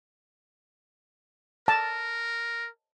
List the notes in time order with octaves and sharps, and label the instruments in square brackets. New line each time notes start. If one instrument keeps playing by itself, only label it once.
[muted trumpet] A#4 [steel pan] A5